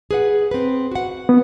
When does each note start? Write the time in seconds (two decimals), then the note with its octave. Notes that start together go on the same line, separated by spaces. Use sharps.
0.11 G#4 B4 F#5
0.51 C4 B4
0.91 F#4 F#5
1.29 B3